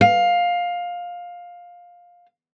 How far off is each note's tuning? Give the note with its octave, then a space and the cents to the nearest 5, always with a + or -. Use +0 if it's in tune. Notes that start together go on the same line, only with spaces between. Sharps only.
F5 +15